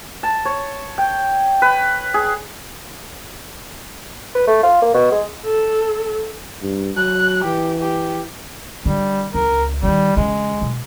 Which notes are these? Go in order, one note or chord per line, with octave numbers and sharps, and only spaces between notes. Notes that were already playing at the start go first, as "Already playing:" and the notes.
A5
C#5
G5
B4
G#4
B4
A3
F4
A#3
B2
G#3
A4
G2
F#3 F#6
E3 G4
G4
D3 G3
C#2 A#4
D3 D#3 G3
E2 C#3 G#3
B2